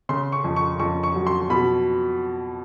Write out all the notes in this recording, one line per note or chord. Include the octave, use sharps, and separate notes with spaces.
C#3 C6
C#6
F2
C#6
F2 C#6
C#6
F#3
C6
B2 B5